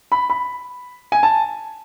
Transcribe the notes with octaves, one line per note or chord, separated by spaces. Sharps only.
B5
B5
G#5
A5